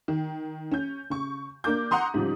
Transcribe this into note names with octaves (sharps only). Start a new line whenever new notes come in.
D#3
C#4 G6
C#3 C#6
A#3 D4 A#4 D6 G6
F#5 A#5 C6 D#6
G#2 C#3 F3 G3